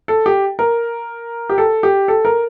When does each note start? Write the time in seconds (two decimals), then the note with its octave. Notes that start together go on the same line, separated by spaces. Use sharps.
0.08 A4
0.26 G4
0.59 A#4
1.50 G4
1.58 A4
1.83 G4
2.08 A4
2.25 A#4